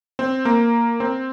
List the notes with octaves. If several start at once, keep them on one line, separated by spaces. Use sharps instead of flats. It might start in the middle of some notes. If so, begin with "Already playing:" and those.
C4
A#3
C4